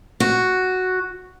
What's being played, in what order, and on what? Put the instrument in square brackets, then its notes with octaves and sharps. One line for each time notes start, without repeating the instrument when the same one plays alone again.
[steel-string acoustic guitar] F#4